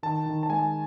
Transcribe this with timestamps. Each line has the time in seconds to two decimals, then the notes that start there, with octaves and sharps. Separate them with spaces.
0.03 D#3 A5
0.26 D#3
0.43 A5
0.49 G#3 G#5